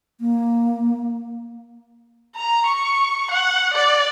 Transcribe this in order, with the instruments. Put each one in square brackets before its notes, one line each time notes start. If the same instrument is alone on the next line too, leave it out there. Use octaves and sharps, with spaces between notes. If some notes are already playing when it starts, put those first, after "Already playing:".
[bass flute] A#3
[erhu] A#5
C#6
F#5
D5